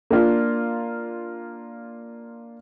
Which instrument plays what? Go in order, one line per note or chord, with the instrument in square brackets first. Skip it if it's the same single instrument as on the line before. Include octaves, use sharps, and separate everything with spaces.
[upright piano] A#3 D4 F4